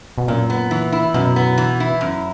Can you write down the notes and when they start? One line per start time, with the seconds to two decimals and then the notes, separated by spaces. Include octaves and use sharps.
0.18 B2
0.28 F#2 A#2
0.50 B3
0.71 E3
0.92 E4
1.14 F#2 B2
1.36 B3
1.58 E3
1.80 E4
2.01 F#2